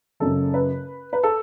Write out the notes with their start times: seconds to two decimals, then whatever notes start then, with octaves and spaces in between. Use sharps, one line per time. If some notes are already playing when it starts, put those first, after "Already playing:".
0.20 F#1 F#2 C#3 A4
0.54 B4
1.13 B4
1.23 A4